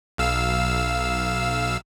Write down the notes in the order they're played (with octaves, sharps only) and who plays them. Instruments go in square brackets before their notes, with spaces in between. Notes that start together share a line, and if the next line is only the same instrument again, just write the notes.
[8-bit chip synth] B1 F5 E6